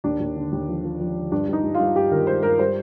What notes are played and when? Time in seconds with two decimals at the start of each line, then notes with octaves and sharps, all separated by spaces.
0.04 D#2 D4
0.20 D#2
0.36 D3
0.52 D#2
0.68 F3
0.84 F3
1.00 F3
1.16 D3
1.31 G2 D4
1.48 G2 D#4
1.64 G2
1.74 F4
1.80 G2
1.95 G2 G4
2.12 D#3 A#4
2.27 G#3 C5
2.43 G2 A#4
2.59 G3 C5